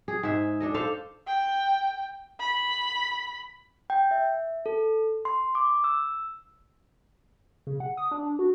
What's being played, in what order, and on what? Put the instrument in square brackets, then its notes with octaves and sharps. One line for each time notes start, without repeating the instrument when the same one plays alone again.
[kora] G#4
G#2 G#4 E5
D4 A4 D#5
A4 C5 F5
[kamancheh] G5
B5
[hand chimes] G5
E5
A4
C6
D6
E6
[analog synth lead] C#3
F#5
D#6
D4
D4
F#4